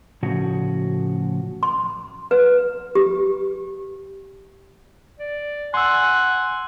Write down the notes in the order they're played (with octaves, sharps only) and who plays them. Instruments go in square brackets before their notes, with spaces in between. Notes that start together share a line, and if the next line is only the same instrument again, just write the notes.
[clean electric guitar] A2 C#3 F3 F#4
[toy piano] C6
B4
G4
[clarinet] D5
[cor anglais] F#5 [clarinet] G#5 [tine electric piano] C6 E6